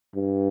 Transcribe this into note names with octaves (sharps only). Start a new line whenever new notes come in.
G2